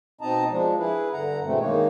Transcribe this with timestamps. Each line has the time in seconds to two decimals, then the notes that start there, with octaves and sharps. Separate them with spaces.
0.21 B2 C4 D#4 D#5 A5 A#5
0.50 F3 G#3 D4
0.78 E4 G#4 B4
1.13 G2 D3 F#5 A#5
1.44 G2 B2 E3 G#3 A3 C4
1.59 D#3 G#3 A#3 D#4 C#5